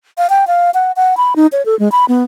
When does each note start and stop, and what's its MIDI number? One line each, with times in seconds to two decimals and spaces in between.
0.18 0.29 77
0.30 0.47 79
0.47 0.71 77
0.74 0.92 78
0.96 1.17 78
1.17 1.34 83
1.36 1.47 63
1.52 1.65 73
1.66 1.78 69
1.79 1.91 56
1.92 2.05 83
2.08 2.23 59